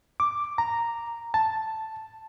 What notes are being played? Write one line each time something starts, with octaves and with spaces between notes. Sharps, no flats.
D6
A#5
A5